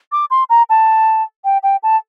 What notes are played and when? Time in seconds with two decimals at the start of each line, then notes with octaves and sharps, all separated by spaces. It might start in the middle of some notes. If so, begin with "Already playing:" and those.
0.12 D6
0.31 C6
0.50 A#5
0.70 A5
1.45 G5
1.63 G5
1.83 A5